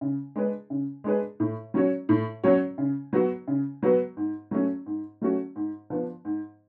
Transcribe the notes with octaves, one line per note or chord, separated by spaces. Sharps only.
C#3
G#3 D4 G#4 B4
C#3
G#3 D4 G#4 B4
A2
F#3 C#4 F#4 C#5
A2
F#3 C#4 F#4 C#5
C#3
F#3 B3 F#4 B4
C#3
F#3 B3 F#4 B4
G#2
F#3 A3 C#4 F#4
G#2
F#3 A3 C#4 F#4
G#2
F3 B3 D4
G#2